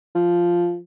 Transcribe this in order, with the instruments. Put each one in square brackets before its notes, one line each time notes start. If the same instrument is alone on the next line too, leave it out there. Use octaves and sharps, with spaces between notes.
[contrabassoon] F3